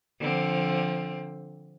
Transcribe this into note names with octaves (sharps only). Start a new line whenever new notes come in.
D3 F3 C4